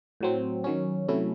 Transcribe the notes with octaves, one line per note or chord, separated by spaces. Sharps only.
A2 F#3 C4
D#3 F#3 C#4
C3 F#3 A3 C#4 E4